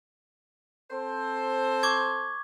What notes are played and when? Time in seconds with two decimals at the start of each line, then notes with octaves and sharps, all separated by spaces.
0.91 C4 A4 C5
1.83 C#6 D6 G#6